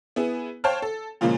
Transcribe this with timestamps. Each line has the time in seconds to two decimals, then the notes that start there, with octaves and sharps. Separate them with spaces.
0.16 B3 E4 G#4
0.64 C5 C#5 F5 G5 A5 F6
0.82 A4
1.21 A#2 C#3 F3 G#3 A#3